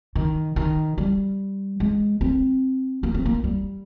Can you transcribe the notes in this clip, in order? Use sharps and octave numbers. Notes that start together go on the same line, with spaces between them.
D#3
D#3
G3
G#3
C4
A#3
C4
A#3
G3